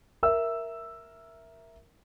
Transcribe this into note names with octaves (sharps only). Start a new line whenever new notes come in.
A#4 E5 E6